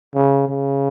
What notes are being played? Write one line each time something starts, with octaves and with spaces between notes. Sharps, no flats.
C#3
C#3